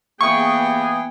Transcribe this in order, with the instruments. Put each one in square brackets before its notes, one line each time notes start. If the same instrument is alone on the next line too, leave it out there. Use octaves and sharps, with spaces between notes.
[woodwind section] E3 A#3 G#4 [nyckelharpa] B3 G5 [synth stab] C#6